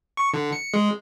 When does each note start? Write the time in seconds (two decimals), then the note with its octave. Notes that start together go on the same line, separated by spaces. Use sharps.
0.17 C#6
0.34 D3
0.52 C#7
0.74 G#3